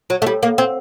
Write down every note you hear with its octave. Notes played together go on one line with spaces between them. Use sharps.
F#3
A3
G3
A#3
C4